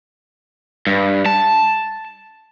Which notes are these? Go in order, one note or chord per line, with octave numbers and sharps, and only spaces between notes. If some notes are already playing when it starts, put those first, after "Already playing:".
G2
A5